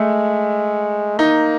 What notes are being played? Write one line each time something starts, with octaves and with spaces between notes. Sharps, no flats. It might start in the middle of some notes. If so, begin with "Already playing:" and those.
Already playing: G#3 A3
A#3 D#4